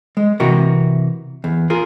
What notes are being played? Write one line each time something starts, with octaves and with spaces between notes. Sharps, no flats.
G#3
C3 E3 F#4 A#4
E2
F4 G#4 A#4